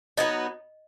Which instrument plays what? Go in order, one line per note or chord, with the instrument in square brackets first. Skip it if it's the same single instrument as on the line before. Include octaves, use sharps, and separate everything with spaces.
[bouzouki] F#3 B3 D#4 [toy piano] D#5